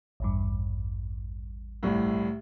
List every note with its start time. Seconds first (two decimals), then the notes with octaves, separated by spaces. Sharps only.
0.20 A1 E2 G2
1.83 C2 A2